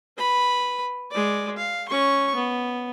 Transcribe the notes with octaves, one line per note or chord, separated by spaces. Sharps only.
B4 B5
G#3 D5
F5
C#4 C#6
B3